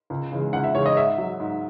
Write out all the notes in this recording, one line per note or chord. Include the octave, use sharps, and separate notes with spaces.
C#2
C#3 E3 G#3
C#2 F#5
E5
C#3 E3 G#3 C#5
D#5
G#2 E5
F#3
G#2